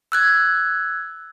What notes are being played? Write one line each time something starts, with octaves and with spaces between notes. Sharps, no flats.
E6 F#6 G#6